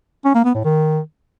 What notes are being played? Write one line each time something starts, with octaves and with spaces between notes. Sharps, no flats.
C#4
A#3
B3
A2
D#3